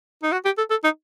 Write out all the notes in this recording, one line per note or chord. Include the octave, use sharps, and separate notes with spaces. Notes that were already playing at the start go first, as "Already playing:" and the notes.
D#4
F#4
G4
A4
A4
D#4